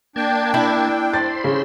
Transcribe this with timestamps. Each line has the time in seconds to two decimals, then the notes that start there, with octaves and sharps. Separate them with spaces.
0.16 A#3 D4 G5 A5 G#6
0.54 E4
1.13 C5 B5 C6 A6
1.44 C#3